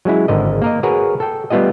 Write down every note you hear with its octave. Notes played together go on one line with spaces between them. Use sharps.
F#3 G#3 C#4 E4
G#1 D3 A#4 D#5
A#3 A#4 D#5
F#4 G#4 A#4 B4 C#5
A4 G5
G3 A3 B3 F4 G4 D#5